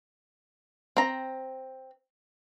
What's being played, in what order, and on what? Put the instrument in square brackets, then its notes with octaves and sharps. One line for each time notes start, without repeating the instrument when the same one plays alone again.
[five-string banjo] C4 A#5